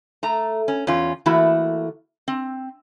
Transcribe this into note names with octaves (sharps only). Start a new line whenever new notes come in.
A3 A#5
C#4
E2 C#4 F4
E3 A3 A#3 E4 F#4
C4